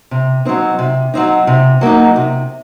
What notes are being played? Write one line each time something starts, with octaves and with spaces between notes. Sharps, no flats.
C3
F#3 C4 D#4
C3
F#3 C4 D#4
C3
F#3 A#3 D#4
C3